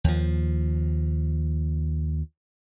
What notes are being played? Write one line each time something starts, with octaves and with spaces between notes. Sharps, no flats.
D#2 F3